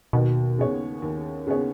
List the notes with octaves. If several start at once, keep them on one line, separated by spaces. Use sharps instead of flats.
D#2 B2
C#3 B3 G#4 C#5
D#2
C#3 B3 G#4 C#5